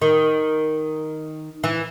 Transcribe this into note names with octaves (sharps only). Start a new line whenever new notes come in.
D#3
E3